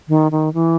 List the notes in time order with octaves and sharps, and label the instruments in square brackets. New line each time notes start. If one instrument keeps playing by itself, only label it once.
[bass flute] D#3
D#3
E3